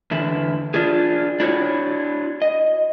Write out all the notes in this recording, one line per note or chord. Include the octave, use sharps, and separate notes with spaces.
E2 D3 E4
D4 F4 G#4
D4 E4 F#4 A4 C#5
D#5